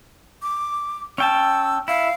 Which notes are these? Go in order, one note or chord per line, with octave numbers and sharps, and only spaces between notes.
D6
C#4 G5 A5 E6
E4 F5